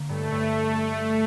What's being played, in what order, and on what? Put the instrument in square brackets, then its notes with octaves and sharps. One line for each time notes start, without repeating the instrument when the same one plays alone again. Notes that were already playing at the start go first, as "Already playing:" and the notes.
Already playing: [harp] D3 A#3
[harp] G2 [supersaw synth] A3
[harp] G2